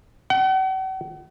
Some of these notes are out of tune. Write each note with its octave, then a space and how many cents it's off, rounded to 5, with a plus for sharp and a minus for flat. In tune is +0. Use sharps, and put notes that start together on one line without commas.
F#5 +45